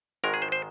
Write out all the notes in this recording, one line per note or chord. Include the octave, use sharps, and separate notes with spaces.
G#1 G#2 D#3 G#3 A#4
G#4
C5
C5